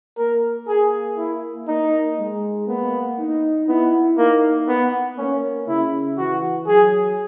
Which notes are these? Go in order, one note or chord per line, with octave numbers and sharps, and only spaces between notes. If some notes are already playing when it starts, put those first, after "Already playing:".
A#3 A#4
G#4
E4
A#3 D#4
G#3
A#3 B3
D#4
B3 E4
A#3 D#4
B3
A#3 C#4
C#3 E4
E3 F#4
F#3 G#4